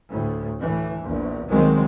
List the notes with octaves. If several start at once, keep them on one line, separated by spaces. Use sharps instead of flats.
D2 A2
A2 E3
A#1 E2
C2 D#3 F#3 G#3 A#3 C4